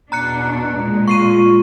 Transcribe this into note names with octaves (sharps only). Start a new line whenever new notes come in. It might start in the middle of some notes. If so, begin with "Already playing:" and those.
E2 B2 D4 A#5 F#6 C#7
A#2 G#3
F4 C#6 C7 D#7